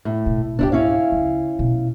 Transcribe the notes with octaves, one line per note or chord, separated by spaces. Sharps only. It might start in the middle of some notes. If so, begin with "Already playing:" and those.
A2
B2
C#2 G#2 D4 E4 G4
C#4 E4 F5
C#2
B2